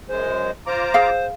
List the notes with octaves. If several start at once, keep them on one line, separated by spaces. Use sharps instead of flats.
F#2 G#3 C5
F4 C5 A#5 D6
G#4 F5